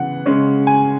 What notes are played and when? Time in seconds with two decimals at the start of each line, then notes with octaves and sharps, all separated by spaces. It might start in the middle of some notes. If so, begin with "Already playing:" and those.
Already playing: C#3 E3 B3 F#5
0.26 C#3 G#3 C#4
0.67 G#5